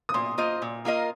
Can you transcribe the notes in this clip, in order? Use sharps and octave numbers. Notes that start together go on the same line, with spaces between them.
D#6
A#2 C6
A#3 F4 C5 D#5
A#2
A#3 F4 A#4 D#5